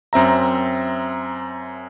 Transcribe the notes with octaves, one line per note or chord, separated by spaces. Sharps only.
F#2 C4 E5 A#5